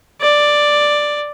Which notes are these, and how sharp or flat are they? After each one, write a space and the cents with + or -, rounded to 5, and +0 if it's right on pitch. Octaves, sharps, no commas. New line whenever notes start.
D5 +5